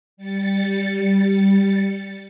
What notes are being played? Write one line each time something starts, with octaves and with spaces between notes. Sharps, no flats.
G3 A6 C#7